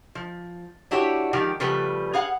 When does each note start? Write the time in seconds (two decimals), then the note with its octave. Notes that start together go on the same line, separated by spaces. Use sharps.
0.15 F3
0.91 D4 E4 F#4 G4 C#5
1.33 D#3 F3 G#3 G4
1.60 C#3 F3 G3 A3 B4
2.13 G#4 F5 F#5